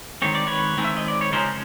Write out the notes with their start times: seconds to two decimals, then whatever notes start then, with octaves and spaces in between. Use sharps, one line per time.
0.22 D#3 G#3 C4 C#5
0.35 D5
0.47 B4 C#5
0.77 D#3 G#3 C4
0.84 E5
0.97 D#5
1.08 D5
1.21 C#5
1.32 C#3 F3 G#3 C#4 A#4 C5